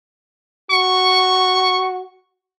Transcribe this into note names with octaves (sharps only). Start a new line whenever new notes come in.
F#4 C#6